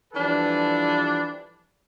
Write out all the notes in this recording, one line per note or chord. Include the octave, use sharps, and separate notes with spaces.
E3 F3 G3 D4 A4 B4